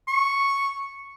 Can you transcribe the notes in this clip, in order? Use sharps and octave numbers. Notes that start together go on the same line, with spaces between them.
C#6